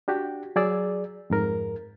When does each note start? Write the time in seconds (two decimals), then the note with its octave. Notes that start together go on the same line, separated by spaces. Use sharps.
0.08 D4 F#4 G4
0.56 F#3 G#4 D5 E6
1.30 F2 G#2 A#4